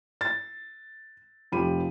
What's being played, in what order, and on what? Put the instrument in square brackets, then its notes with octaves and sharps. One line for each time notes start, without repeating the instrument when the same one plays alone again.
[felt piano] A6
F1 F3 G4 B5 D#7